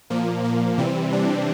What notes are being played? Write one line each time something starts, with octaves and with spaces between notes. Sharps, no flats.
A#2 F3 A#3
A#3
C3 E3 G3 C4
D4